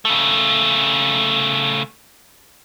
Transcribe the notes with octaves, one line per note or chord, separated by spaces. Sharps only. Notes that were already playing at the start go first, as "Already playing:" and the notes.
C#3 A3